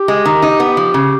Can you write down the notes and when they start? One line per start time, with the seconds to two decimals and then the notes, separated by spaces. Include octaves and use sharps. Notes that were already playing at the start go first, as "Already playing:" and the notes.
Already playing: G4
0.08 G#3
0.25 D#3
0.42 D#4
0.60 B3
0.77 F3
0.94 C#3